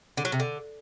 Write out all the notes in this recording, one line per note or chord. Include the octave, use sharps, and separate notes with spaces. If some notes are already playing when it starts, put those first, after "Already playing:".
D3
F#3
C3
D3